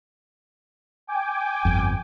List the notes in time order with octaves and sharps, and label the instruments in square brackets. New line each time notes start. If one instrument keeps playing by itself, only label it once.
[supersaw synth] G5 G#5 D6
[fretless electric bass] G1 F2